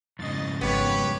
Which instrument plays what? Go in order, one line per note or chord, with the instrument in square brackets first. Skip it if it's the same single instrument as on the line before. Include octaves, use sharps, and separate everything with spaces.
[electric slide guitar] F2 G#2 C#3 [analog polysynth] D#5 A6
[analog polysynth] G#1 [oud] B3 [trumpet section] G4 B4 C#5